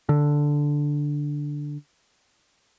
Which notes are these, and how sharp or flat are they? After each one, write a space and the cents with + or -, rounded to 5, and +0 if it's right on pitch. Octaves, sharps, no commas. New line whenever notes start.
D3 +0